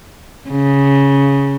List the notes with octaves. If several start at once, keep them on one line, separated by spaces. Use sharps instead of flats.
C#3